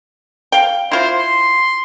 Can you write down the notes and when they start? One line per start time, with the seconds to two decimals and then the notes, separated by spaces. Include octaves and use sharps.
0.52 F5 G5
0.92 E4 F4 C5
1.19 C6